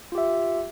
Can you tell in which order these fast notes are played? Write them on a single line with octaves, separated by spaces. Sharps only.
F4 G4 E5